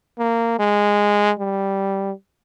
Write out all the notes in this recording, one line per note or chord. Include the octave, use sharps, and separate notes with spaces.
A#3
G#3
G3